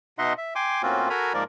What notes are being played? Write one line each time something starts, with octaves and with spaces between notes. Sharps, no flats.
B2 D#4 D#5 E5 F#5 C6
E5
G5 G#5 C6 D6
A2 A#3 C4 C#4 F4 F#4
F#4 A4 A#4 G#5 A#5 B5
G#2 F3 A#3 A#4 D5